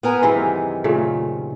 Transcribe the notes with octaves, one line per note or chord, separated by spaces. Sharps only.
B3 A#4 G#5
F#2 C3 D#3 E3 G#3 E4
A#2 C#3 A3